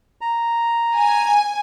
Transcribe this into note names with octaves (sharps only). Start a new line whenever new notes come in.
A#5
G#5